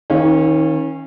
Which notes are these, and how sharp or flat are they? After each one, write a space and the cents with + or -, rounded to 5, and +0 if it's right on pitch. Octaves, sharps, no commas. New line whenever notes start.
D#3 +30 C#4 -25 F5 +0